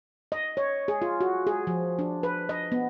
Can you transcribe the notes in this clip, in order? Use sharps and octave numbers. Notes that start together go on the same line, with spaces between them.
D#5
C#5
G#4
F4
F#4
G#4
F3
D4
B4
D#5
B3